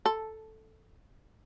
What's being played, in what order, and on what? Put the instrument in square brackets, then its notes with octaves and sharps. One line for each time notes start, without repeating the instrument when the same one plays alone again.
[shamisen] A4